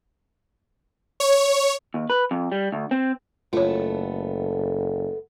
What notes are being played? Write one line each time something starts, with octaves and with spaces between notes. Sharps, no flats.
C#5
D#2
B4
F2
G3
D2
C4
F#1 A3 B3 F4 A4 C#5